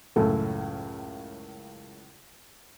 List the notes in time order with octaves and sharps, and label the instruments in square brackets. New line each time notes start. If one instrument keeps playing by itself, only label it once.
[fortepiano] C#2 F#2 A2 [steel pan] A4